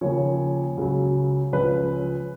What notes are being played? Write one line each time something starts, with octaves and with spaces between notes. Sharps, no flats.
D#2 C#3 F3 C#5
C#2 C#3 F#3
C#2 C#3 F3 B4